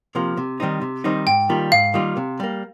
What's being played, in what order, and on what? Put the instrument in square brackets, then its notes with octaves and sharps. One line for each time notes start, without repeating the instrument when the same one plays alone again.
[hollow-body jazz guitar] C3 F3 A#3
C3
D#3 G3 C4 D#4
C3
D#3 G3 C4 D#4
[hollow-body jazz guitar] G#2 [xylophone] G5
[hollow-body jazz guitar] D#3 G3 A#3 F4
[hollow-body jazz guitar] G#2 [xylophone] F5
[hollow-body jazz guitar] D#3 G3 A#3 F4
C3
G3 A#3